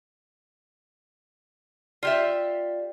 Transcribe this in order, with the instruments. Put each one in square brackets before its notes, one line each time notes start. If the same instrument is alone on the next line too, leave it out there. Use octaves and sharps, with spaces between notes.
[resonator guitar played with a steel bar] F4 G4 E5 [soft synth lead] D5